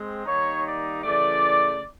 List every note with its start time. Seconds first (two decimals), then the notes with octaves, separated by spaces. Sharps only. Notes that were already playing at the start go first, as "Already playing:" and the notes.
Already playing: G#3 C4
0.25 D#3 G3 A#3 D#4 C#5
0.64 D5
1.03 C#3 E3 A3 D5